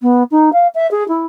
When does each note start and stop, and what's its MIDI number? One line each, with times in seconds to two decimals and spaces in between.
0.01 0.23 59
0.31 0.52 63
0.52 0.67 77
0.74 0.89 76
0.91 1.06 68
1.08 1.26 64